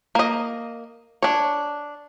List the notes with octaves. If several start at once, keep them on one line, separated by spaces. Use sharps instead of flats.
A#3 D#5
D4 C#5